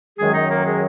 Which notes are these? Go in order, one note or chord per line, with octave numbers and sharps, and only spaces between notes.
F#2 D#3 F#3 G#3 G#4
D#4 D#5
A#3 A#4
G#3 G#4